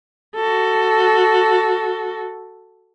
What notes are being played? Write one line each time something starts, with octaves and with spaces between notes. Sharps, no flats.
F#4 A4